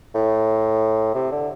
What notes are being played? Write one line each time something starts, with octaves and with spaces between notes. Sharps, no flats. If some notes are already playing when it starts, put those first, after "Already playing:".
A2
C3
D3